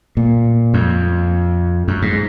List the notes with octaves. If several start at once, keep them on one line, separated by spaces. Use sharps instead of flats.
A#2
F2
F#2
G#2